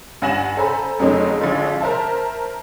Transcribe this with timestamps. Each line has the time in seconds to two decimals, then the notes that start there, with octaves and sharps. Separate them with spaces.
0.22 G2 F#5 G#5 A#6 E7 F#7
0.57 A4 C5 G#5 A#5 B5
0.99 F2 F#3 G#3 A3 C4 D#4
1.40 A1 D3 F3 G#3
1.80 A#4 C5 E5 A5